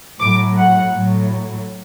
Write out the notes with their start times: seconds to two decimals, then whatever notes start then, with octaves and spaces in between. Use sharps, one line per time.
0.19 A2 F#3 D6
0.56 F#5
0.93 A2 F#3